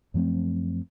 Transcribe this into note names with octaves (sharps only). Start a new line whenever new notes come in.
F#2 F3 A3 C4